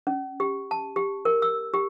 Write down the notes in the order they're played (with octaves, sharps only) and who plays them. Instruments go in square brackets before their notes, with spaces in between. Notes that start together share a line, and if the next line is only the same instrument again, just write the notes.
[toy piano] C#4
G4
A5
G4
A#4
E6
G4